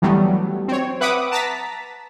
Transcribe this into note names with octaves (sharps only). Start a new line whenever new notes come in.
E3 F#3 G3 A3 B3
C4 C#5
B4 E5 F#5 B5 D6 D#6
A5 A#5 A6 B6